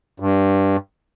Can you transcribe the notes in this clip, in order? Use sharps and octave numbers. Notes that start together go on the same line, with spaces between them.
G2